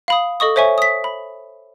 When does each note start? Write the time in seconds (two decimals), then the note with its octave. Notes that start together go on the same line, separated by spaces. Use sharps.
0.08 F5 B5 D#6
0.40 A4 D#5 C#6 D#6
0.56 C5 C#5 E5 G#5 C#6
0.78 D#6 B6
1.04 B5